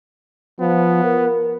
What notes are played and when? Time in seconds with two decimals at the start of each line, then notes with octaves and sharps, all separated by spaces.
0.60 F3 B3
1.04 A#4